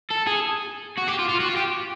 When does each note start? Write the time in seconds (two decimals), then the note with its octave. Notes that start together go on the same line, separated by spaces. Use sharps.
0.10 A4
0.27 G#4
0.98 F#4
1.08 G4
1.19 F4
1.29 F4
1.40 F#4
1.49 F4
1.56 G4